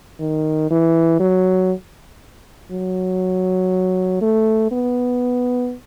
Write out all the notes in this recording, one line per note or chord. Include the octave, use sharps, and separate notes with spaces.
D#3
E3
F#3
F#3
A3
B3